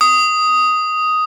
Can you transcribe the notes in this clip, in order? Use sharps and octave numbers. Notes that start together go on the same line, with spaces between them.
D#6